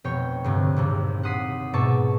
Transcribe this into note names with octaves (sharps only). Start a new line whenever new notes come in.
F1 B2 C#5 G5
D2 G2 C3
A#1 D#2 C3
F#5 C6 D#6 B6 C7
G#2 B2 E5 A5 C#6 D6